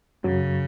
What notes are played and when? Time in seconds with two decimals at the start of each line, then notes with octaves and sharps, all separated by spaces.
0.24 F#2 C#3 F#3